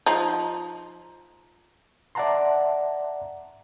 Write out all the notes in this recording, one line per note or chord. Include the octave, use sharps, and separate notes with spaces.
F3 D#4
D5 E5 F#5 A5 A#5 C6